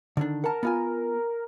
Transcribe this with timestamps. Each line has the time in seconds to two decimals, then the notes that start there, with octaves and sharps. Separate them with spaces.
0.17 D3 D#3 D4
0.44 A#4 F#5 A5
0.63 B3 F4 G#5